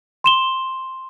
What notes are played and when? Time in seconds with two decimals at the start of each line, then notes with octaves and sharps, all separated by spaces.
0.24 C6 E7 G7